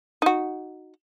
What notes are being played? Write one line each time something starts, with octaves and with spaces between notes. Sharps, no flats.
D#4 F#4